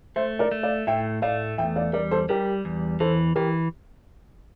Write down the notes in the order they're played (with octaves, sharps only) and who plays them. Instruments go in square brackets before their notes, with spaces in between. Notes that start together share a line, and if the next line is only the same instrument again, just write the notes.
[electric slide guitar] A3 [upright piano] C5 E5
[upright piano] A#4 D5
[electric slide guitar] A3
[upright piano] D5 F5
[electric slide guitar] A2 [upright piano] E5 G5
[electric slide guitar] A3 [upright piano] D5 F5
[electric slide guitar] E2 [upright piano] E5 G5
[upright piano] D5 F5
[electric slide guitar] G3 [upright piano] A#4 D5
[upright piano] A4 C5
[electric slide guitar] G3 [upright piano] G4 A#4
[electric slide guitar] E2
[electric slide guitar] E3 [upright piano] A4 C5
[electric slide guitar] E3 [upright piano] G4 A#4